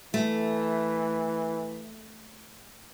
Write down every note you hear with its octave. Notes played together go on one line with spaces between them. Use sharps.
E3 A3